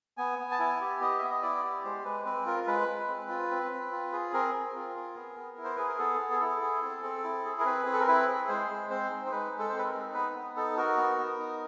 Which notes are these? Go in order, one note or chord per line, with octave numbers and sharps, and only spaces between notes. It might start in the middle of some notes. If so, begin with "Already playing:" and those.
B3 G#5
B3
A5
E4 G#5
G4
B3 D#5
B3 E5
D#5
E4 D5
G4
G#3 C5
G#3 B4
C4 B4
F4 A#4
G#3 B4
G#3
C4
F4
C4
C4
F4
G#4
C4 A#4
C4
F4
G#4
B3
B3
E4
C5
G#4 B4
A#4
B3 A4
B3
G#4
E4 A4
G#4
C4
C4
E4
G#4
A#4
C4 B4
C4 G#4
A4
A#4
E4 B4
G#4
G#3 C5
G#3
C4 C5
D#4
C5
G#3 B4
G#3
A4
C4 C5
B4
A#4
D#4
B3 B4
B3
D#4 A4
F#4 A#4
B3
B3
D#4